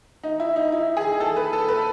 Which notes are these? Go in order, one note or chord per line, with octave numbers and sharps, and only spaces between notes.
D#4
E4
D#4
E4
G#4
A4
B4
A4
B4